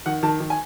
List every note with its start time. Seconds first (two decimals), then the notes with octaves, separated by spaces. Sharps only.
0.06 D#3 F#5
0.23 D#3 A5
0.40 D#3
0.50 G#5